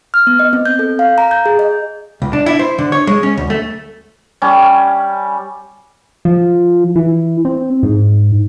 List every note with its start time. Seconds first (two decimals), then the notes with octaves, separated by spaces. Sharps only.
0.14 F6
0.27 B3
0.39 D#5
0.53 C4
0.66 G6
0.79 A4
0.99 F5
1.18 A#5
1.31 G6
1.46 G#4
1.59 D#5
2.22 C#2
2.33 D4
2.46 E4
2.59 C5
2.78 D3
2.92 C#5
3.07 G#3
3.23 C#4
3.37 D2
3.50 A3
4.42 G3 C#4
6.25 F3
6.95 E3
7.45 C4
7.83 G#2